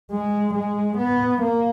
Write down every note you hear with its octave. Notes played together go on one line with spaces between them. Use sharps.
G#3
G#3
B3
A#3